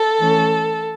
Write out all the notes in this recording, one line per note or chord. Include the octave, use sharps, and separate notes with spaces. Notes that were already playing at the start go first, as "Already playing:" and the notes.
Already playing: A4
E3 A3 C#4